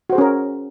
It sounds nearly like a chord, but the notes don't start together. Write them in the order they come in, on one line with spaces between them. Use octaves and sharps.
F#4 C5 G#4 C#4 A#4